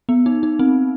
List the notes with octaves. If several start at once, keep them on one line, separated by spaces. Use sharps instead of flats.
B3
D#4
D#4
C4